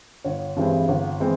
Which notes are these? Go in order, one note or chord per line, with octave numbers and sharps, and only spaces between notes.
G1 C#5
G2 E3 G#3 C4
G1
E3 G#3 C4